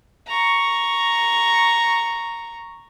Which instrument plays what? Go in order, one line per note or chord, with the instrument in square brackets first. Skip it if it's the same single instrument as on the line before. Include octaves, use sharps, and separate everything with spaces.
[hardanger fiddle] A#5 C#6